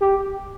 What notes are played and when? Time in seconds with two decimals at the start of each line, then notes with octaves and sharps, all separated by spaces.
0.01 G4